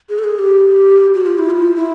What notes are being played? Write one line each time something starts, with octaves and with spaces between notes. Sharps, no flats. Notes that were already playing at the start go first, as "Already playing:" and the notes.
G#4
A4
G#4
G4
F#4
F4
E4
F4
E4